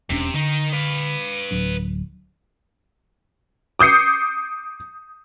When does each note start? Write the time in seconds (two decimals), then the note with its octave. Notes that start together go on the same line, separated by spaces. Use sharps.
0.10 E1 C3 C#4 D4
0.34 D3 D#3 D#4
0.73 B4 F5
1.51 D1 F#3 D4
3.79 D6 D#6 G6 C7 C#7